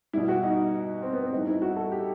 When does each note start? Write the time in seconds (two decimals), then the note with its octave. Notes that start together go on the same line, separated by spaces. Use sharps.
0.13 B2 G3 E4
0.28 F#4
0.43 D#4
1.03 C4
1.13 B3
1.22 C4
1.32 A2 E3 G3 D#4
1.47 E4
1.62 F#4
1.76 A4
1.92 G4